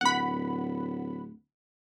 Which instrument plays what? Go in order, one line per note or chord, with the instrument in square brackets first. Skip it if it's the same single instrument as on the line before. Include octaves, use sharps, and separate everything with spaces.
[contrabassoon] D1 [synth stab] F#5 B5